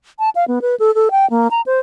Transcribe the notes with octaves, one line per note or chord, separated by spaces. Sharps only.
A5
F5
B3
B4
A4
A4
G5
A#3
A#5
C5